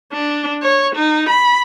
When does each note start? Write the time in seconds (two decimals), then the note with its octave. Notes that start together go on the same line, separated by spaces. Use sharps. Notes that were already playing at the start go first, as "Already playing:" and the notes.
0.13 D4
0.62 C#5
0.95 D#4
1.29 B5